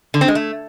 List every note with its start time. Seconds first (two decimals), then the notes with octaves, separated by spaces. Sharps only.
0.14 D3
0.21 C4
0.28 G#3
0.35 A3